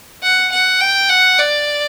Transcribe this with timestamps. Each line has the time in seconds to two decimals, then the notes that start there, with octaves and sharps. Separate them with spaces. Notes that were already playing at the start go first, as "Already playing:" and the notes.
0.23 F#5
0.52 F#5
0.81 G5
1.09 F#5
1.39 D5